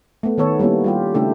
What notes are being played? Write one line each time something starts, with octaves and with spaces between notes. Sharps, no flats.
A3 B3
D#3 B3 A4 C#5
G3 A#3 B3 C#4 E4
G3 F4 G4
C#3 A3 D4 E4 G4 A4